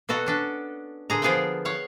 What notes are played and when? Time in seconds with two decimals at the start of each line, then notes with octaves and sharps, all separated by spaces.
0.09 B2 B3 F#4 A4 A#5
0.26 C#4 D4 A4
1.10 A#2 D3 G#4 A#5
1.22 F3 B3 G#4 A#4 F5 G5
1.65 C#5 F5 F#5